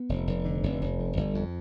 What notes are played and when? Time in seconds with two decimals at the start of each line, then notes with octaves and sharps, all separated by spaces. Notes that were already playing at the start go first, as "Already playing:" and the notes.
Already playing: B3
0.09 F1
0.27 F1
0.45 D3
0.63 F1
0.81 F1
0.99 F2
1.17 G1
1.35 F2